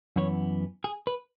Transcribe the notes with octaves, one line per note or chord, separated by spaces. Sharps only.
F#2 E3 B3 C#5
G#4
B4